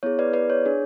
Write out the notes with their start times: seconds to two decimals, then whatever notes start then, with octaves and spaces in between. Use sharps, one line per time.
0.03 B3 E4 G#4 C#5
0.19 B4 D5
0.33 B4 D5
0.50 C#5
0.66 D4 G#4